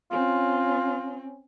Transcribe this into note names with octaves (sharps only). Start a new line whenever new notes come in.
C4 C#4 F4